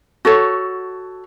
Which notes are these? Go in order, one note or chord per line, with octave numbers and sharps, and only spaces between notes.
F#4 A4 C#5